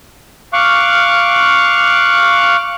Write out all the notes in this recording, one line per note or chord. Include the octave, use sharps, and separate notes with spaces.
F5 C#6 D6 F6 F#6